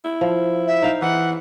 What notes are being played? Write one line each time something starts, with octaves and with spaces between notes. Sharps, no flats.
E4
F3
E5
D#4 F5 G5
E3 F#5